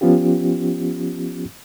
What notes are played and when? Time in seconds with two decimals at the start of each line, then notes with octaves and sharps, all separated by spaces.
0.01 F3 B3 C#4 F4 G4